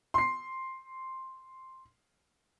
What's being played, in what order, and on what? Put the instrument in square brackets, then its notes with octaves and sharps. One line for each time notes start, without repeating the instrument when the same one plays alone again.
[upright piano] C6 C7